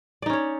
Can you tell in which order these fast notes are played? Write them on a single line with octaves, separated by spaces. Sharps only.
D5 D#4 C#4 C#5